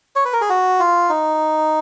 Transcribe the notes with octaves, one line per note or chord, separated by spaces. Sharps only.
C#5
B4
A#4
G#4
F#4
F4
D#4